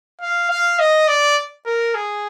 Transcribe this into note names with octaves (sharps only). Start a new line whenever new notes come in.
F5
F5
D#5
D5
A#4
G#4